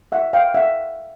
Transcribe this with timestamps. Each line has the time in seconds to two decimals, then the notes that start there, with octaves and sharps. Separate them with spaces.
0.12 E5 F#5
0.33 F5 G5
0.54 E5 F#5